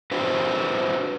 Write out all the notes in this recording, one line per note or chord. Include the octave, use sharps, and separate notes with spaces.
D4 F#4 B4 C5